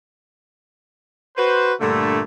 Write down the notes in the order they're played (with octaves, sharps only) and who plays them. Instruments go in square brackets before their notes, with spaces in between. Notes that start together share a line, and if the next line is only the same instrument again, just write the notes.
[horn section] F#4 B4 C5
G2 A#2 D3 A3